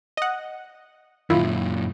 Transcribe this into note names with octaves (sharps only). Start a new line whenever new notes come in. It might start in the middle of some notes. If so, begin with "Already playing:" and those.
D#5 F#5
F#2 A#2 D#3 E4 F4